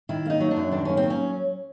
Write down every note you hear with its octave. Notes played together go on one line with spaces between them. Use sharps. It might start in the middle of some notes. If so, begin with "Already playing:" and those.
D#3 E4
A#3 D#4
F#3
D4
F#2
D#3 D4
A#3 C#4
C4
F#3
C#4